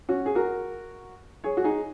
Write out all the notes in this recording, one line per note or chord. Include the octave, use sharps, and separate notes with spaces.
C#4 F#4
G#4
F#4 A#4
G#4 C#5
F#4
D#4 G#4